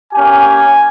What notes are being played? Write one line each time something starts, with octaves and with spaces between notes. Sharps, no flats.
A#3 C#4 G4 G#5